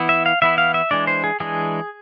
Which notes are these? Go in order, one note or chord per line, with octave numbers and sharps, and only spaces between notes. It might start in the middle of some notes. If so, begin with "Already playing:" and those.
Already playing: E3 B3 E4
E5
F5
E3 B3 E4 E5
F5
E5
E3 G#3 D4 D5
C5
G#4
E3 G#3 D4 G#4